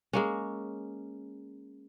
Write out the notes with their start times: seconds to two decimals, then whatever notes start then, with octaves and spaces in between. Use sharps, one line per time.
0.13 G#3 A#3 C#4